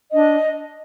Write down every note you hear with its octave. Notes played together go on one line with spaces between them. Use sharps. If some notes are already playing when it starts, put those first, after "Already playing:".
D4 D#5